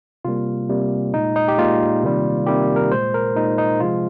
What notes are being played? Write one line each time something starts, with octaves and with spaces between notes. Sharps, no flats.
C3 G3 A#3 F4
C3 G3 A#3
A#2 G#3 D#4
D#4
G4
A#2 G#3 F4
C3 D#3 G3 A#3
C3 D#3 G3 A#3 G4
A#4
A#2 G#3 C5
A#4
A#2 G#3 D#4
D#4
C3 F3 G#3 F4